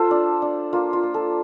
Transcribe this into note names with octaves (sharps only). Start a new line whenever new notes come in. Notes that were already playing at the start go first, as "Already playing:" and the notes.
Already playing: F4 A4 C5
D4
D4
A#3 F4
F4
A#3
A4